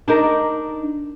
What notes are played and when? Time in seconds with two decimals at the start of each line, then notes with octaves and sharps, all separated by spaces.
0.08 D4 D#4 A#4